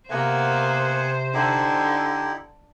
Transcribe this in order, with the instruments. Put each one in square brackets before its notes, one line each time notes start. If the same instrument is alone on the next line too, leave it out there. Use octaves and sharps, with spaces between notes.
[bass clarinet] C3 [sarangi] A#3 [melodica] B3 F#5 G#5 [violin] C5
[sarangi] D3 [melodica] D#4 E4 G4